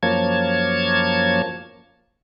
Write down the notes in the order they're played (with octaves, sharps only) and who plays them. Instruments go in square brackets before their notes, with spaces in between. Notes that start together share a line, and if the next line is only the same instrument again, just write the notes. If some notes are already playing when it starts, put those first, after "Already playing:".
[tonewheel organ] F#2 F3 A#3 C#5 A5 G#6